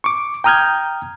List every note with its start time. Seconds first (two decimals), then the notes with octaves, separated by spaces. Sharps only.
0.04 C#6 D6
0.44 G5 A#5 D#6 F6 G6 G#6